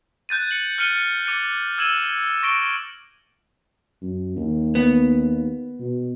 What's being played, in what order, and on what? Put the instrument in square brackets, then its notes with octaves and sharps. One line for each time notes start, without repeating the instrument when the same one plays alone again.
[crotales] F#6 G6 A6 D#7
C#7 F#7
F6 F#6 A6 C#7 D#7 G7
D6 A6 C#7 D#7
E6 G#6 D#7 E7 F#7
C#6 A#6 D7 G7
[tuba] F#2
D#2
[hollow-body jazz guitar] B3
[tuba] B2